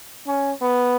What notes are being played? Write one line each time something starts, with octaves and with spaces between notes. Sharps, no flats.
C#4
B3